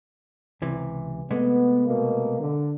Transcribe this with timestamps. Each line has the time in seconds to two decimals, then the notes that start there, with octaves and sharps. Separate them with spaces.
0.62 C#2 C3 E3
1.31 C3 G#3 A3 B3
1.86 B2 A#3
2.39 D3